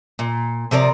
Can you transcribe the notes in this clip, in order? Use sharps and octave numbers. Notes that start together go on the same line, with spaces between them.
A#2
C3 F3 A#4 D5